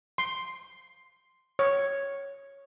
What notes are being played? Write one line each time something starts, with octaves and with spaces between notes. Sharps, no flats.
C6
C#5